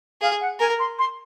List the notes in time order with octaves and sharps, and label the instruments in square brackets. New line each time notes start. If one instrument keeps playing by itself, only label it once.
[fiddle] G#4 [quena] F5
[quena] F#5
[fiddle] A#4 [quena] G#5
[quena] C6
C6